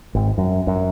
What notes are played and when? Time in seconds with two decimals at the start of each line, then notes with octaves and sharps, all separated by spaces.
0.15 G#1
0.38 F#2
0.67 F#2